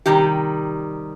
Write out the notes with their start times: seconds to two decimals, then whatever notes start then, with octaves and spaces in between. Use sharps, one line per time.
0.06 C3 D#3 G3 G4